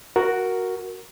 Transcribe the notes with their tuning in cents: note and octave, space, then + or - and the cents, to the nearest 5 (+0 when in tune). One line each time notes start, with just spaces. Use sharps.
F#4 +0 A#4 +0